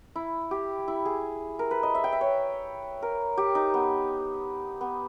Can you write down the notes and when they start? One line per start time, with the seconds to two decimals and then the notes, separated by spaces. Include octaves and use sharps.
0.16 E4
0.51 G4
0.88 E4
1.05 G#4
1.59 A#4
1.71 B4
1.83 D#5
1.95 E5
2.04 G5
2.12 E5
2.21 C#5
3.02 A#4
3.37 G4
3.55 D#4
3.74 B3
4.81 B3